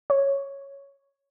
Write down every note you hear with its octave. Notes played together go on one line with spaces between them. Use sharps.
C#5